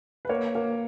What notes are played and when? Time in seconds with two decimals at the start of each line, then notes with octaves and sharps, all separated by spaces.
0.25 B4
0.29 A#3 C#5
0.55 A#3